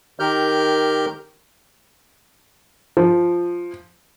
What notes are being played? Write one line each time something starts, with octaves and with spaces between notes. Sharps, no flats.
D#3 G4 A#4 F6 G6
F3